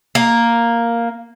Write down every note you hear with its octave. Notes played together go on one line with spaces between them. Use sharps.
A#3